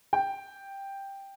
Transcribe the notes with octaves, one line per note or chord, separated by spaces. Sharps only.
G5